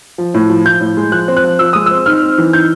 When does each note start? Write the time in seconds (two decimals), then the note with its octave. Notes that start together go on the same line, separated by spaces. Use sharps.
0.18 F3
0.34 A2
0.50 F3
0.65 F3 G6
0.81 A2
0.97 G#3
1.12 F3 F#6
1.28 C4
1.37 F#6
1.44 F3
1.59 F3 E6
1.73 G#3 D#6
1.86 C4 E6
2.06 D#4 F6
2.23 C4
2.38 E3
2.53 D#4 G6